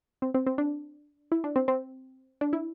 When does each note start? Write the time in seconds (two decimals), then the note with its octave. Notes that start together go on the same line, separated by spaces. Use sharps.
0.22 C4
0.34 C4
0.47 C4
0.58 D4
1.32 E4
1.44 D4
1.56 C4
1.68 C4
2.41 D4
2.53 E4